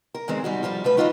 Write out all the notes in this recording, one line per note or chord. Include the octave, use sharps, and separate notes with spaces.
A#4
E2 D#3 G#3 C4
G3 D#4 F#4
F3 G3 F4 A4
F3 A3 B4
D4 D#4 F4 F#4 A4 D#5